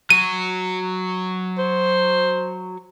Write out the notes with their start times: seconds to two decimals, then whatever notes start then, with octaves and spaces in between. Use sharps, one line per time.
0.10 F#3 F#4 D#7
1.58 C5